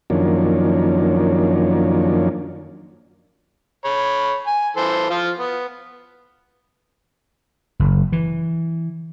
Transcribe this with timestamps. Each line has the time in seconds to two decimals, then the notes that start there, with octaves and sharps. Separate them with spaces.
0.10 F#2 D#3 F3 A#3 C#4 D4
3.85 C#5 B5
4.47 G#5
4.77 E3 A4 C5
5.10 F3 F4
5.39 B3
7.80 F#1
8.13 E3